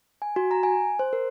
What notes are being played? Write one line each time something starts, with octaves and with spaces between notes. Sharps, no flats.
G#5
F#4
A#5
G#5
C5
A#4